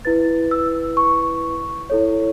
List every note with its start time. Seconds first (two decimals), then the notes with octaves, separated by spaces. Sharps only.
0.05 E4 B4 A6
0.51 E6
0.97 C#6
1.90 E4 A4 C#5